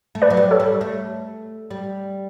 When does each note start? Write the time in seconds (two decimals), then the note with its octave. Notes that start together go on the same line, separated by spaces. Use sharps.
0.15 A3
0.22 B4 D5
0.30 F#3
0.37 G3
0.51 A4 C#5
0.60 G3
0.81 A3
1.71 G3